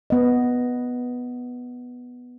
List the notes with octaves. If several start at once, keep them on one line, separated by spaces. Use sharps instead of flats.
B3 D#5